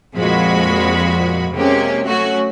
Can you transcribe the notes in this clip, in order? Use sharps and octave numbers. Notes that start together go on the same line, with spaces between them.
F2 A#2 F3 G#3 F#4 B5
C3 G#3 A#3 C#4 G4
F#3 A3 C#4 F#4